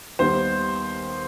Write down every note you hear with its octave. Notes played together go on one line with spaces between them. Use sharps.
D#2 D#3 G3 B3 C5